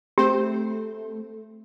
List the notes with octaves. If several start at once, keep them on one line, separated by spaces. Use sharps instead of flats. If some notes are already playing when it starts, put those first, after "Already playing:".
A3 C4 G4 C5